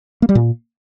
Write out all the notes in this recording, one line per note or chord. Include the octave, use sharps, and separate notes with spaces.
A#3
G3
A#2